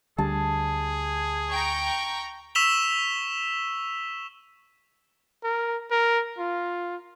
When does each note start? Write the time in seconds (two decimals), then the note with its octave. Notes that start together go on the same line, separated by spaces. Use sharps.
0.18 D2 D3 G3 G#4 A5
1.52 G5 A#5 C#6
2.55 C#6 E6 B6 E7 F7 G7
5.44 A#4
5.91 A#4
6.38 F4